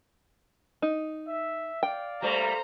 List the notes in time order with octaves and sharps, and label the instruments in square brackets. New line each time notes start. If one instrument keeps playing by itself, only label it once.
[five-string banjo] D#4
[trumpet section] E5
[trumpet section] D5 F5 [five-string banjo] G5
[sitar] G3 A3 A#3 [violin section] C5 A#5